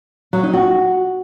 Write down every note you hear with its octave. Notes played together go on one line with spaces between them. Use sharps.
F#3
D#4
F#4